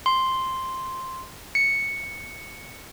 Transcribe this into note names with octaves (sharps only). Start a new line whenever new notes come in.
C6
C#7